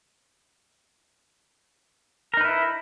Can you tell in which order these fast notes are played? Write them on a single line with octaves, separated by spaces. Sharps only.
A#4 D#4 B4 E4